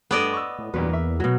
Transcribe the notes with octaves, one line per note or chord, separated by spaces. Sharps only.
G2 A3 B3 A4 D5 D#5
C#6 E6
A2
E2 G2 A#2 F#3 B4
A#3 E5
B2 F#3